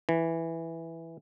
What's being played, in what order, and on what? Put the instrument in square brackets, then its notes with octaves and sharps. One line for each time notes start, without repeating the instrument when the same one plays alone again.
[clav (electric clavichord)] E3